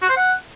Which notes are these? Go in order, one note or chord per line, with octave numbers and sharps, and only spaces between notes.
F#4
C5
F#5